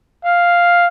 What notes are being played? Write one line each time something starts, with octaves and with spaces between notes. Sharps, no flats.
F5